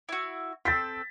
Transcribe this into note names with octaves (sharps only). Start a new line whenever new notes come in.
E4 F#4
C4 A4 A6 B6